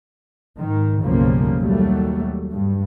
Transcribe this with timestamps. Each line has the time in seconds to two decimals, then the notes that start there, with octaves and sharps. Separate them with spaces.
0.58 G#2 D#3
1.02 B1 F#2 C#3 F3 G3 A#3
1.60 D#2 F#3 G3 A3
2.52 G2